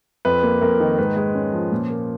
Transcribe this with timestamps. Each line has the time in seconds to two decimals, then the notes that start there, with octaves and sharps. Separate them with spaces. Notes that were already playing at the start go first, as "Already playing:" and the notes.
0.25 F2 B4
0.43 A#3
0.61 F2 A#4
0.80 D#3
0.98 G#2 B4
1.16 G#3
1.35 C#4
1.53 F3
1.72 A#2
1.90 A#3